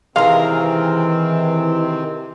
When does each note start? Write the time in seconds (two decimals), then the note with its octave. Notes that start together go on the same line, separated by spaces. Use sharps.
0.16 C3 D#3 E3 G#3 C4 A#4 F5 C6